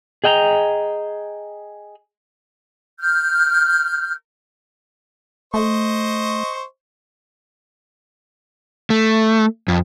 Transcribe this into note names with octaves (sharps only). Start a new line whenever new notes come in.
G#4 D#5 G5 A5 A#5
F6 G6
A3 C5 D#5 C#6
A3
F2